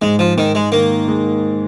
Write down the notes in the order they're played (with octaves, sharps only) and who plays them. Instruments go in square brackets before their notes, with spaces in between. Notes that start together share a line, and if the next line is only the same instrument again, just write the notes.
[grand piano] G#2 [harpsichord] G#3
[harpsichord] F3
[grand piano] G#2 [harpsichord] D#3
[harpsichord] G#3
[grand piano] D#3 [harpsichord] A#3
[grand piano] G#3